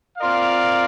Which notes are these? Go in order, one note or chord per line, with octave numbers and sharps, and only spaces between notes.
C4 F4 A#4 D5 F5